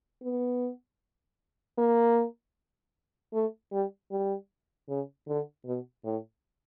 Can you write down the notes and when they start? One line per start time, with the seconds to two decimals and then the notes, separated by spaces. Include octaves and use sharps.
0.23 B3
1.78 A#3
3.33 A3
3.72 G3
4.11 G3
4.89 C#3
5.27 D3
5.65 B2
6.04 A2